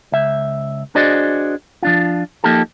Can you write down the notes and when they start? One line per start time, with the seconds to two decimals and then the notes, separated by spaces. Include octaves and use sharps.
0.12 C#2 E5
0.95 D4 F#4 G#4 C5 D5 D#5
1.83 F3 D4 F4
2.44 F3 A#3 D#4 G4 A4